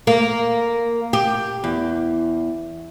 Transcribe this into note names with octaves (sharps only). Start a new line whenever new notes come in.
A#3
G4
E2